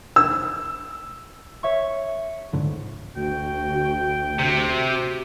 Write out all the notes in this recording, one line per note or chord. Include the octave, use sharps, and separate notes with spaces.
E6
C#5 E5 C#6
C#2 G#2 D3
D2 F#4 G5
C3 F#4